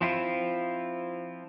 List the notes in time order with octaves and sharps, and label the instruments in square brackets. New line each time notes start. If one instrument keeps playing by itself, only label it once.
[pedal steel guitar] F3 C4 E4 F4